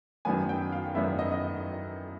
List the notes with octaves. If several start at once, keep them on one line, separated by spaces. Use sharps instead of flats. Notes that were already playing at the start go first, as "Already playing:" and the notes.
F#2 D#3 F#3 B3 G#5
G5
F5
F#2 D#3 F#3 B3 E5
D#5
D#5